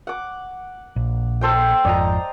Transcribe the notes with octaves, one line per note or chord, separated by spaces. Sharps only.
F#5 D6
A#1
A4 C5 G5
G#1 F2 D5 D#5 A#5